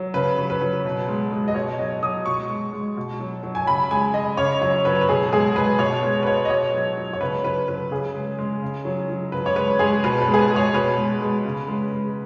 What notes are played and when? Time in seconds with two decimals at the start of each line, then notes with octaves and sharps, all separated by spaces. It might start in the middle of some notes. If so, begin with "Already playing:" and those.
Already playing: F#3
0.14 C#3 B4
0.38 F#3
0.50 B4
0.61 F#3
0.85 B2
1.08 G#3
1.32 G#3
1.48 D#5
1.55 B2 C#5
1.78 F#3 D#5
2.03 F#3 D#6
2.26 B2 C#6
2.50 G#3
2.73 G#3
2.97 B2
3.20 F#3
3.43 F#3
3.55 G#5
3.67 C#3 B5
3.91 G#3 G#5
4.14 G#3 D#5
4.37 C#3 C#5
4.61 F#3 C#5
4.85 F#3 B4
5.01 B4
5.08 B2 G#4
5.33 G#3 G#4
5.56 G#3 B4
5.79 B2 C#5
6.03 G#3
6.23 B4
6.26 G#3 C#5
6.45 D#5
6.50 B2 C#5
6.73 F#3
6.97 F#3
7.13 C#5
7.20 C#3 B4
7.44 F#3 B4
7.68 F#3 B4
7.91 C#3 G#4
8.14 G#3
8.39 G#3
8.62 C#3
8.85 F#3
9.09 F#3
9.32 C#3 B4
9.46 C#5
9.56 G#3 B4
9.79 G#3 G#4
10.04 B2 B4
10.22 B4
10.27 G#3
10.34 G#4
10.39 B4
10.50 G#3
10.56 C#5
10.74 B2 B4
10.97 G#3
11.21 G#3
11.45 C#3
11.68 G#3
11.92 G#3